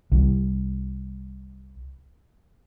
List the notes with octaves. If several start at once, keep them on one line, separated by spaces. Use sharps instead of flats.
C2 G3